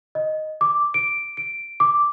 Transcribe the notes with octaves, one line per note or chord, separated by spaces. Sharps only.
D#5
D6
D7
D7
D6